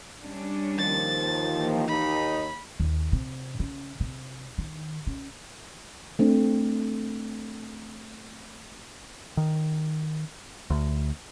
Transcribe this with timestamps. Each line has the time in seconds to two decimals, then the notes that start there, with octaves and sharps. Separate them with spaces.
0.21 G3 C#4 D4
0.78 D#2 D#3 F3 A6
1.41 E3 A#3
1.88 D#2 D#4 B5
2.80 D#2
3.12 C3
3.59 C#3
4.00 C3
4.58 D#3
5.07 C#3
6.19 A3 C4 D4
9.37 D#3
10.70 D2